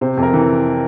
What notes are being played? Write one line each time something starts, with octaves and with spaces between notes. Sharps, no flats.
C3 C5
F2
A#4
E3